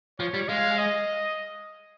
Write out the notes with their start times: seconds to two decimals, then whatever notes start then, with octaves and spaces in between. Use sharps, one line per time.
0.20 F3 C#5
0.34 G3
0.49 G#3 F5
0.78 D#5